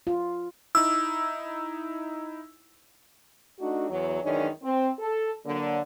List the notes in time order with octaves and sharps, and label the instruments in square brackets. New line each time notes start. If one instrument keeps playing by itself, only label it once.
[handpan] F4
[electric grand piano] D#4 E4 [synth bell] E6
[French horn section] A3 D4 D#4 F#4
E2 F#3
F#2 D#3 E3 G#3 C#4 D4
C4
A4
D3 F#3 A#3